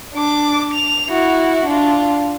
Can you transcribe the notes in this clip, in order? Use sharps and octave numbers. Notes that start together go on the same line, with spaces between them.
D4 D6
F7
E4 F#4
D4 F4